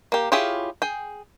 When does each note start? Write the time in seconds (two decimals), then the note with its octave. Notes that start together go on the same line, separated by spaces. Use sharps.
0.12 A#3 G4
0.32 E4 F4 G4 G#4 C#5
0.82 G#4 G5